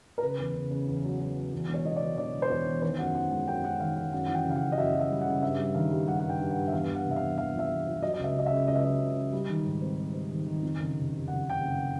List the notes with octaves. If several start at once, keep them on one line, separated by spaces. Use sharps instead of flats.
A#4
C#3 B4
E2
C#3
C#3
E2
F#3
F#3
F#3
E2
E1
C#5
E1 D#5
D5
E1
E1 D5
E1
C5
E2 C#5
E2
D#3 C5
F#2 F#5
D#3 F#5
G#3 F#5
F#2 G5
F#2 F#5
D#3 F5
D#3 F#5
F#2 F#5
E3 F#5
G5
C#3
F5
F#5
F#2
D#5
F#2 E5
F#2
E5
G3
C#3 F#5
G2 E5
G3
D#3 F5
G3
G3 F#5
G2 F#5
G5
G2
F#5
G2
E5
E2 F5
E2
F#5
C3
E5
F5
E2
E2 F5
F3 E5
E2
F3
F#3 D#5
D#5
C#2 E5
C#2 D#5
E5
C#3
C#2 D#5
E5
F#3 D#5
C#3
C#3
G3
D#3
G#2
C4
C4
C4
D#3
D#3
F2
F#1
C3
C3
F#1 F#5
F#1
G5
F#1
F#5